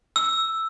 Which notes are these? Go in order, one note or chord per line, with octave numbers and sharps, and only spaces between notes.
E6